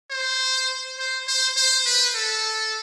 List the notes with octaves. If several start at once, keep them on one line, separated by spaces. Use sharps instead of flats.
C5
C5
C5
C5
B4
A4